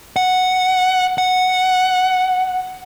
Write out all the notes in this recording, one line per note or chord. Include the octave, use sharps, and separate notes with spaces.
F#5
F#5